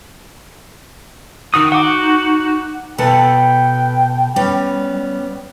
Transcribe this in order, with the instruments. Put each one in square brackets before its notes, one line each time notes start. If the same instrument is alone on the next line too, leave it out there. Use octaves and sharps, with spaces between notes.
[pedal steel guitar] D#3 F#4 D#6 [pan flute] D#4
[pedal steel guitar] F#4 [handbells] F#5 D6
[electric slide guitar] B2 B3 A4 [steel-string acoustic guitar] B4 [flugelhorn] G5
[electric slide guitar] G3 [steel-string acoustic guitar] B3 C#4